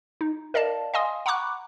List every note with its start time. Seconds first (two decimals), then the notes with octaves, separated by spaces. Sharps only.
0.21 D#4
0.54 A#4 D5 D#5 F5 A5
0.94 D#5 F5 G#5 C6 D#6
1.26 F#5 A#5 B5 C#6 D6 F#6